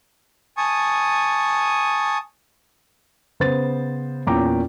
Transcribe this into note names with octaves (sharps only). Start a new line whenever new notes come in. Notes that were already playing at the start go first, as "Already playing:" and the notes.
G#5 A5 C#6 D#6
C#3 B3 C5 A6
E2 A#2 C#4 G5 A#5 D6